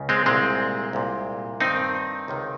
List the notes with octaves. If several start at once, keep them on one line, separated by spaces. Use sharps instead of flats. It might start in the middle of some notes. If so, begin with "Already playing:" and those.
Already playing: C#2 C#3
G#3 C4
C2 A#2 G#3 C4
C2 A#2
G2 D#3 C4 D#4
C#2 C3 D#3